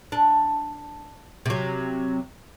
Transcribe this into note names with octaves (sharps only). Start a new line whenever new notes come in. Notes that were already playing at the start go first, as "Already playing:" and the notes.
D4
C3 F#3